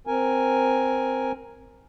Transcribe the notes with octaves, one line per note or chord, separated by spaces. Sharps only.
C4 A#4 G#5